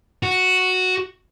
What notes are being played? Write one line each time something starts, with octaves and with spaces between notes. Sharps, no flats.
F#4